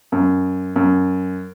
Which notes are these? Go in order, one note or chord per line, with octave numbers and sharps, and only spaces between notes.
F#2
F#2